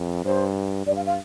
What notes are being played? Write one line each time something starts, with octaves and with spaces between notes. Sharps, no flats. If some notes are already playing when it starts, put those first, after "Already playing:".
Already playing: F2
G2 C5
G2 D5
F5
F5